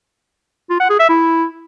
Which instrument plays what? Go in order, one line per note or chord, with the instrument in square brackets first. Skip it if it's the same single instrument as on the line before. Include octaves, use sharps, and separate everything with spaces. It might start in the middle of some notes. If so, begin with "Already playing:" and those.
[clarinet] F4
F#5
G#4
E5
E4